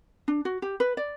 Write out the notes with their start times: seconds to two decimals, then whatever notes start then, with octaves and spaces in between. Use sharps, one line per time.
0.28 D4
0.45 F#4
0.62 G4
0.80 B4
0.97 D5